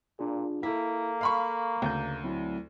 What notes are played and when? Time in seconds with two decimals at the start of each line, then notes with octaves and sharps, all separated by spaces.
0.19 A#2 D4 F4 G#4
0.63 A#3 E4 A4 B6
1.21 F5 B5 C#6
1.82 D2 C#3 G6
2.24 F#3 C4 E4